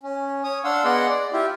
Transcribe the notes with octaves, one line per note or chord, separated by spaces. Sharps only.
C#4
C#5 D#6
D4 F5 F#5 C6 E6
B3 G#4 D5 D#5 F#5 C6
D5
E4 F4 G4